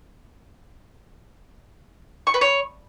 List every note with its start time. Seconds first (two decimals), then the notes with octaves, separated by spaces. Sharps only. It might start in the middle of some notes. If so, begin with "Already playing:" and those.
2.27 C#6
2.34 B4
2.41 C#5